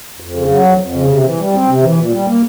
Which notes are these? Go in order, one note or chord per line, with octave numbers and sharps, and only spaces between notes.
F2
C#3
F#3
F2
F2
C#3
C3
E3
G3
C4
C3
E3
A#2
G3
A#3